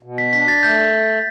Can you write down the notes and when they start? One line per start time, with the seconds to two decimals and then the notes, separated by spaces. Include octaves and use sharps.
0.03 B2
0.18 B6
0.33 D4 B6
0.48 A6
0.63 A3 G6